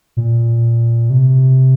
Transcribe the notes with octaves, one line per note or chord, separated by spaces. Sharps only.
A#2
C3